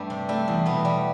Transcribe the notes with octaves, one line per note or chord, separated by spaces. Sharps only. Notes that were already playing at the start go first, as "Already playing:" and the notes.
Already playing: G2 G3 A3
C3
G3 A3
E2
B2 B3
G3